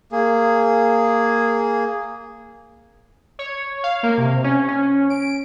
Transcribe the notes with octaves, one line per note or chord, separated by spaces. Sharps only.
A#3 G#4
C#5
F5
A#3
C3
C#4
C#4
D7